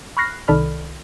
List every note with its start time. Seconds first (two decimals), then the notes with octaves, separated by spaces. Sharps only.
0.17 B5 C#6 F6 F#6 A#6 C7
0.48 C2 D#3 A4 D5 B5 F6